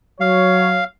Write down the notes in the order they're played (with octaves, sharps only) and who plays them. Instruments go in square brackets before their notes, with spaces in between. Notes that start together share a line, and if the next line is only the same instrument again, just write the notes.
[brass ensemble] F#3 C#5 [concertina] F5